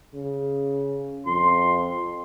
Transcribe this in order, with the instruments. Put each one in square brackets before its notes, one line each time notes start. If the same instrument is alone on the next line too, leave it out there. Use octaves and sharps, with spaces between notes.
[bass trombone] C#3
[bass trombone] F2 [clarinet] C6